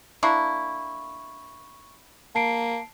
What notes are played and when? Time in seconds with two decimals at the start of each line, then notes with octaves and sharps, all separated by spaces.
0.23 A#3 D4 E4 C#6
2.35 A#3 A5 C7 D7